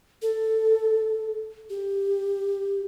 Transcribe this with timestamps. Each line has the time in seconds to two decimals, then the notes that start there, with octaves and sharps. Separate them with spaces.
0.22 A4
1.70 G4